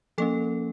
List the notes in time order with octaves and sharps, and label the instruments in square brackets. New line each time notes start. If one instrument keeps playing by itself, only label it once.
[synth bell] F3 A#3 C#4 A4